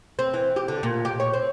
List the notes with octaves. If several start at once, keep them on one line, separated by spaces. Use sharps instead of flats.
C4
E3
G4
D3
A#2
G4
C#5
C4